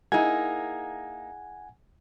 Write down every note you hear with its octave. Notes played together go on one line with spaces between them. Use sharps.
A#3 D#4 E4 G#4 F#5 G#5 G#6